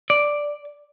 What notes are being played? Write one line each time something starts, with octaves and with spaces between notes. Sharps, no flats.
D5